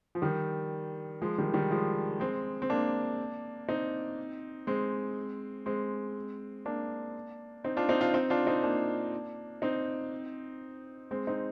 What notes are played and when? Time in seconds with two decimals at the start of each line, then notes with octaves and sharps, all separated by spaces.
0.15 F3
0.22 D#3 G3
1.21 F3 G#3
1.38 D#3 G3
1.54 D#3 G3
1.71 F3 G#3
2.20 G#3 C4
2.62 C4
2.70 A#3 D4
3.68 C4 D#4
4.67 G#3 C4
5.66 G#3 C4
6.65 A#3 D4
7.64 C4 D#4
7.77 D4 F4
7.89 C4 D#4
8.01 D4 F4
8.14 C4 D#4
8.30 D4 F4
8.47 C4 D#4
8.63 A#3 D4
9.62 C4 D#4
11.11 G#3 C4
11.27 C4 D#4